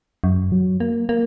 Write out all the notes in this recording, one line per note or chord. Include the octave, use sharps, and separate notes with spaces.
F#2
F#3
A#3
A#3